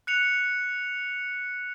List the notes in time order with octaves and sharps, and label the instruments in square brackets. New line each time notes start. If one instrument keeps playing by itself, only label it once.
[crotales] F#6 C#7 F7